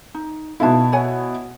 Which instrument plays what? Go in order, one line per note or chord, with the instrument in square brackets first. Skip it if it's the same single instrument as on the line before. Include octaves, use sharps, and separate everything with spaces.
[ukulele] D#4
[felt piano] B2 B3 E4 [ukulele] F5 A5
[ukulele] C#5 F#5 G#5